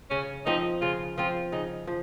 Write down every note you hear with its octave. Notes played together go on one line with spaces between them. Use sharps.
C#3 C#4
F3 C4 D#4
C#3 F4
F3 C4 F4
C#3 D#4
F3